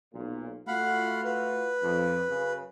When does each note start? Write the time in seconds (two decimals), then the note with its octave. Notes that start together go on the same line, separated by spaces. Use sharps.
0.14 B1 A#2
0.68 A3 F4 F#4 F5 F#5 B5
1.24 B4
1.83 F2
2.28 F#2 C#3